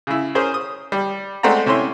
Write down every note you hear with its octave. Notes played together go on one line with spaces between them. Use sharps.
C#3 E4
C#4 G#4 A#4 C5
D#6
G3
G#3 A3 C4 D5 F#5 A#5
C3 C#4 E4 C#5 C6